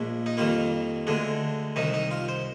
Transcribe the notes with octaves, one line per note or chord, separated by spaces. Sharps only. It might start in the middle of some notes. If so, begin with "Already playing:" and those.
Already playing: A#1 A#2 G#3 D4
D#4
F2 D#3 G3 A#3 F4
D2 D3 G#3 D4
C2 C3 D#3 D#4
D#4
F4
C5